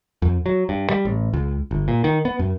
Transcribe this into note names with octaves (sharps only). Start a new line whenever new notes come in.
F2
F#3
G2
G3
A1
C#2
G1
A#2
D#3
B3
F#2